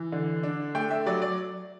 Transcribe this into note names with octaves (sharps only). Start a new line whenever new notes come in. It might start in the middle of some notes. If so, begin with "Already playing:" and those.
Already playing: E3
D3
D4
A3 G5
E5
F#3 D5
D5